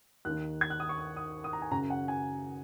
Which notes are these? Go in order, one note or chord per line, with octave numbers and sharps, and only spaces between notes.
D#2 D#3 F#6
G#6
F#6
D#6
C#6
D#6
D#6
D#6
A#5
G#5
F#2 C#3 A#5
F#5
G#5